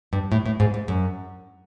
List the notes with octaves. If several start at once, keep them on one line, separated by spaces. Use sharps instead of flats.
G2
A2
A2
G#2
G#2
F#2